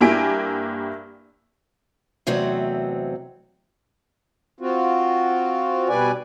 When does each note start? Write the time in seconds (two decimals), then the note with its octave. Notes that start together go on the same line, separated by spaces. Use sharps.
0.01 G2 A#3 E4 G4 G#5 D7
2.27 E2 C3 F#3 A3 C4 D#5
4.60 C4 F4 F#4
5.89 B2 G3 B4 D5 G#5